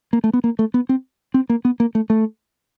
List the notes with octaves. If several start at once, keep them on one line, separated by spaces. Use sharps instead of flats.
A#3
A3
B3
A#3
A3
B3
C4
C4
A#3
B3
A#3
A3
A3